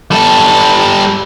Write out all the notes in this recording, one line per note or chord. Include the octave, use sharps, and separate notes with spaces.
G3 A4